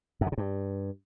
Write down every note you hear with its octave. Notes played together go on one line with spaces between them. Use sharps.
F#2
D3
C3
G2